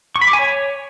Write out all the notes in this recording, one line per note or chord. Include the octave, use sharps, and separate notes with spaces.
C#6
B5
D6
G#5
C#5